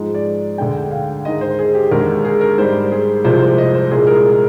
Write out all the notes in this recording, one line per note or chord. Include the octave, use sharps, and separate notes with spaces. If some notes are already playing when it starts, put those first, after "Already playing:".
Already playing: G#2 F3 G#3
D5
D2 D3 G#3 G5
F5
G#2 D#3 G#3 D#5
C5
G#4
G4
D#2 D3 G#3 A#4
G#4
A#4
G#2 G3 C5
G#4
C2 C3 F3 G#3 C5
C5
D#5
C5
C2 A#2 G#3 G#4
A#4
G#4